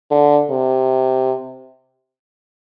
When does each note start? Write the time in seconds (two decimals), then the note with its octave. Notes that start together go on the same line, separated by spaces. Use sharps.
0.11 D3
0.51 C3